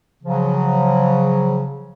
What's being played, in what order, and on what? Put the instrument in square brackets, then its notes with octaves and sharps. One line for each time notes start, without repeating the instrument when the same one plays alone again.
[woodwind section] C#3 F3 F#3